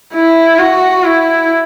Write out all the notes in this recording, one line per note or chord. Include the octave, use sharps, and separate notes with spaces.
E4
F#4
E4